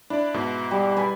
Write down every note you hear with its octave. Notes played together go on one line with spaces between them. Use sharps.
D4 E4 D5
G#2 B2
G3
B4 D5 G#5